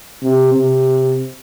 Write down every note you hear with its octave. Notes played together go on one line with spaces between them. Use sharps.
C3
C3